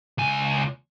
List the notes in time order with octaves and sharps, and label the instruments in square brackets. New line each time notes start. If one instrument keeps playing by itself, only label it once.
[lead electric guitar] C#2 G#5